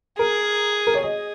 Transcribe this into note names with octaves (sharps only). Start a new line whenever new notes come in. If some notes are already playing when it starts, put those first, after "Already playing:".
G#4 A#4
A#4
C#5
G#4 D#5